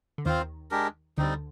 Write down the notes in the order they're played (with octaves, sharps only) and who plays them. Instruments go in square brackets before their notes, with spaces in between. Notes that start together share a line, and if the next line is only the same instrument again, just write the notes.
[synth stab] D3
[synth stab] D#2 D#3 [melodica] C4 F4 C5
[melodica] G#3 D4 G4 A#4
[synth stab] D2 D3 [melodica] G3 C4 D#4